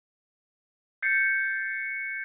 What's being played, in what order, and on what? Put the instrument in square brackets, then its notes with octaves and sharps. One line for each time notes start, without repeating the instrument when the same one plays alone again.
[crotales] G6 A6 C7 C#7